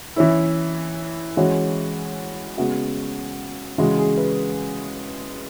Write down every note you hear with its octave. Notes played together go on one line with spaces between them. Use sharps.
E3 C#4 E4
E3 G#3 C#4 F#4
C#3 G#3 B3 F#4
C#3 E3 G#3 F#4
G#4
B4